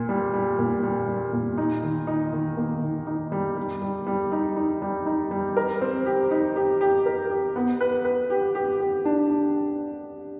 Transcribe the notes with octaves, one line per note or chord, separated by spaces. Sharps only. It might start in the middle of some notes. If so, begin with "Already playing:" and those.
Already playing: A#2 A#3
G3
G3
A#2
G3
G3
A#2
D#4
D#3
D#4
D#3
A#3
D#3
D#4
G3
G3
G3
G3
D#4
D#4
G3
D#4
G3
A#4
C4
G4
D#4
G4
G4
A#4
G4
B3
B4
B4
G4
G4
G4
D4
D4